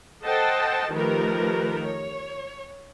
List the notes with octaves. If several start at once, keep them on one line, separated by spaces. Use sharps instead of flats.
A4 C5 D#5 F#5 G5 A5
D#3 F3 A3 G4 A#4 B4
C#5